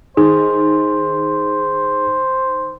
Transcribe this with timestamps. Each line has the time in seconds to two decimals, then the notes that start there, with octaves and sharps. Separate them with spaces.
0.17 D#3 G#4 C5